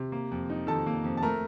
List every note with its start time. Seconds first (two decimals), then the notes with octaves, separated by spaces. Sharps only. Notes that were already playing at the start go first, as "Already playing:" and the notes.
Already playing: C3
0.12 A#3
0.31 F2
0.50 D#4
0.67 D#3 A4 A5
0.86 A#3
1.04 F2
1.17 A5
1.22 A3 A#4 A#5